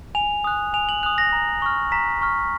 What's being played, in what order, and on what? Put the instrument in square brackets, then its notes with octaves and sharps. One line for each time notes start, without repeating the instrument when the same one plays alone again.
[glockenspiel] G#5 F7
D#6 F#6
G#5 F7
F#7
D#6 F#6 F7
A#6
A#5
C#6 F6
A#5 B6
C#6 F6